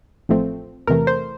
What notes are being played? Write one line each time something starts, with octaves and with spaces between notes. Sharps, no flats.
A1 A2 F3 A3 C4
E2 C3 E3 A3 A#4
C5